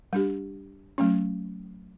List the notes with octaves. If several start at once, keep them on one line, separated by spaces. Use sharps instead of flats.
G3 D4 G4
F#3 A3 C#4